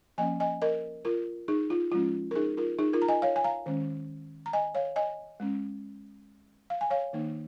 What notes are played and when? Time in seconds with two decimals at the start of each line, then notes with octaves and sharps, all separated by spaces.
0.18 F3 A#3 C#4 D#5 G#5
0.40 D#5 G#5
0.62 A#4 D#5
1.05 F4 A#4
1.48 D#4 G#4
1.70 F4
1.92 F3 G#3 C#4 F4
2.31 A#4
2.35 D#4 G#4
2.57 F4 A#4
2.79 D#4 G#4
2.93 F4 A#4
3.02 A#5
3.08 D#5 G#5
3.22 C#5 F5
3.36 G#5
3.44 F5 A#5
3.66 D#3 G#3 C#4
4.46 A#5
4.53 D#5 G#5
4.75 C#5 F5
4.96 D#5 G#5
5.40 G#3 C#4
6.70 F5
6.81 G#5
6.90 C#5 F5
7.13 D#3 A#3 D#4